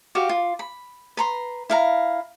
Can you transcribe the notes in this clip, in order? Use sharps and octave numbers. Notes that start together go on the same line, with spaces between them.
F#4 G4 F5
F4
B5
B4 A#5 C6
E4 F5 A#5